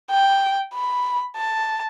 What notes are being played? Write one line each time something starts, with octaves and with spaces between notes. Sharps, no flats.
G5
B5
A5